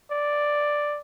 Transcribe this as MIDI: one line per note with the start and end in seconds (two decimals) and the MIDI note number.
0.11 1.00 74